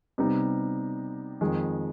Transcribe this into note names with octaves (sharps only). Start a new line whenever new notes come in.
C3 G3 B3 D#4
F2 D#3 G#3